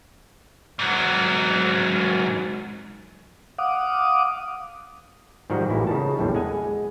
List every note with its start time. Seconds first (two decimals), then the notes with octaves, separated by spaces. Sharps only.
0.79 G#2 F#3
3.58 F5 F#5 D6 D#6
5.50 G#2 D#3 F3 G3 D#4 F#4
5.69 A1 A#2 A#3 E4 G4
5.87 C#3 D#4 A5
6.18 A#1 E2 A2 D3 G3
6.35 G#3 F#5 G#5